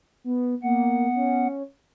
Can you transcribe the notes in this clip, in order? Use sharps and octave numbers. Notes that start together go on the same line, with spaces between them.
B3
A#3 B3 F#5
C#4